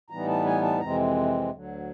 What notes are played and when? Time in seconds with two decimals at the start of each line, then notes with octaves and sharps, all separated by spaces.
0.10 A2 E3 G3 B3 D#4 A#5
0.28 A5
0.45 G#5
0.62 A5
0.79 F2 C3 E3 G#3 C4 A#5
1.50 D2 D3 F#3